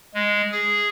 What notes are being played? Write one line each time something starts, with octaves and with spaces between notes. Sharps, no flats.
G#3
G#4